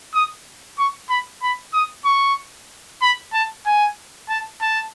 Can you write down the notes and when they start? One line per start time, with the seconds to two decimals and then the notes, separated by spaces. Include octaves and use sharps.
0.14 D#6
0.78 C#6
1.09 B5
1.42 B5
1.73 D#6
2.05 C#6
3.02 B5
3.33 A5
3.66 G#5
4.29 A5
4.61 A5